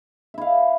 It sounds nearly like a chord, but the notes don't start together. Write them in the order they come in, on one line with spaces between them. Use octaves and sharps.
E5 E4 F5